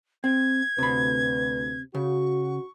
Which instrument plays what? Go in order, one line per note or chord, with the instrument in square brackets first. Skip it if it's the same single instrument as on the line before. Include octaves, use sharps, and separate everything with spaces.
[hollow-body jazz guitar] C4 [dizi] G#6
[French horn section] D2 B4 [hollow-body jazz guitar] C3 B5
[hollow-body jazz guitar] C#3 [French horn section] F#4 [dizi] C#6